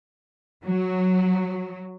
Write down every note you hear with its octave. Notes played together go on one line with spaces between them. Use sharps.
F#3